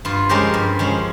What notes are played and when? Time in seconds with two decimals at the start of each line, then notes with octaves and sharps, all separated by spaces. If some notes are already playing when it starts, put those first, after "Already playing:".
0.05 G2 F4
0.29 F3 G#3 C#4 G4 A#4
0.54 G2
0.79 F3 G#3 C#4